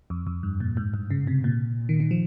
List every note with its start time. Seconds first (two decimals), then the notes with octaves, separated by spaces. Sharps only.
0.10 F2
0.27 F2
0.43 G2
0.60 A#2
0.77 G#2
0.94 G2
1.10 C#3
1.27 C3
1.44 A#2
1.89 D#3
2.00 D#3
2.11 F3